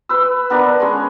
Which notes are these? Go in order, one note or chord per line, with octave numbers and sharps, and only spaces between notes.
B4 E6
B3 D4 A#4
G#3 C#4